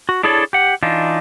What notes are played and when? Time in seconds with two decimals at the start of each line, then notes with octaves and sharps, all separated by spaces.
0.09 F#4
0.23 D4 E4 G#4 A4 C#5 D5
0.53 G4 F#5
0.83 E3 D4 D#4 F4